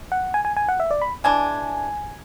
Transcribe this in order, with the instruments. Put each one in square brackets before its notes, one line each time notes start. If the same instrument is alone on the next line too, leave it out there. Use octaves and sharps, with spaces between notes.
[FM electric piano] F#5
G#5
G#5
G#5
F#5
E5
D5
B5
[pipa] E3 G#3 D4 [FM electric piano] G#5